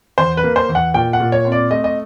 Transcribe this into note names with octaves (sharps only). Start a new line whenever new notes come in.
E2 C5
B4
A#3
C5
E2
F#5
A#2 G5
F#5
A#2
C#5
C4
D5
A3 D#5
D#5